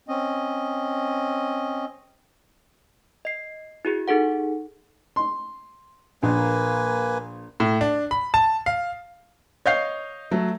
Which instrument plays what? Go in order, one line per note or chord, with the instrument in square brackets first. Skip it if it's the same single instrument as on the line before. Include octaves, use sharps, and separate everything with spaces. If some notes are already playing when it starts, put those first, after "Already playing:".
[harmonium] C4 C#4 D#5
[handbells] D#5 C7
E4 F#4 G#4
D#4 G#4 A4 F#5
[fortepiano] C6
[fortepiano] A#1 [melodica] A#3 B4 G#5
[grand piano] A2
D4
B5
A5
F5
[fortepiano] C#5 F5 [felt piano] D#5 G6 C7
[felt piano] F#3 [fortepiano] A3